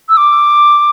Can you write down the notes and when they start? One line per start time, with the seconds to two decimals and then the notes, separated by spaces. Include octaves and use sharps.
0.09 E6
0.17 D6